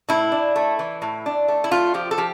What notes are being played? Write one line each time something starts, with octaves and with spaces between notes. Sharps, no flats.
A2 E4
D4
A3
E3
A2
D4
A3
E4
A3 F4
F3 G4
A4
F3 G4